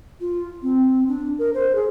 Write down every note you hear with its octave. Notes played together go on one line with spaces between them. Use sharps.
F4
C4
D4
A#4
C5
G#4